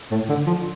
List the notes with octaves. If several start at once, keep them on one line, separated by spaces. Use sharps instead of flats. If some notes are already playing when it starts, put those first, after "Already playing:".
A2
D3
F3